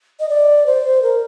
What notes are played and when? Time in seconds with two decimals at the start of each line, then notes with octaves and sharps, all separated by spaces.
0.20 D#5
0.29 D5
0.66 C5
1.02 A#4